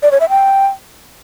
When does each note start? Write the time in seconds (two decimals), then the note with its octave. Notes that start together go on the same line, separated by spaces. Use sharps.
0.03 D5
0.11 C#5
0.20 E5
0.29 G5